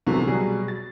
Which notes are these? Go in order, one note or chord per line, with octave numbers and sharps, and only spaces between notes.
C2 C3 E3 F#3 A3 B3
B2 F#3 G3 G#4
A6